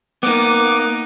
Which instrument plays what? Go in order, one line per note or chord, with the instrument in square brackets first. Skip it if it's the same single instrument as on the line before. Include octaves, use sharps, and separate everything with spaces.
[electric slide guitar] A#3 B3 [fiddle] D#4 [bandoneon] D6